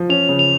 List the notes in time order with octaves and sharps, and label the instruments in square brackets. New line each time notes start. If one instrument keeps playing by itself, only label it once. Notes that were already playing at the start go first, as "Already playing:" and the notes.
Already playing: [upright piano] F3
[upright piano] C#4 [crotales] F7
[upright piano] C#3
[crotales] F7